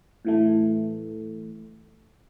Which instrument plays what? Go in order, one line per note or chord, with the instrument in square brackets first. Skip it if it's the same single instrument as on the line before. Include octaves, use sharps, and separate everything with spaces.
[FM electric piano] A2 E3 A3